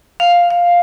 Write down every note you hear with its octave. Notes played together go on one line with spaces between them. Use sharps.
F5
F5